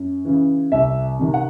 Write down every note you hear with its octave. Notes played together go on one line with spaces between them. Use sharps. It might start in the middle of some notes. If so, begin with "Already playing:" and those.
Already playing: F#2
C#3 E3
C2 E5
C3 D#3
F#5